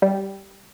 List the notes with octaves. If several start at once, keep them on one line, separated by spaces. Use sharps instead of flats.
G3